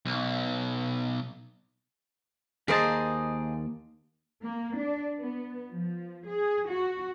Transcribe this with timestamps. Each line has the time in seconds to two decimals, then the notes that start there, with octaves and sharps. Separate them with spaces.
0.06 B1
2.68 D#2 A#3 G#4 C5 D#5 A5
4.43 A#3
4.75 D4
5.19 B3
5.70 F3
6.26 G#4
6.68 F#4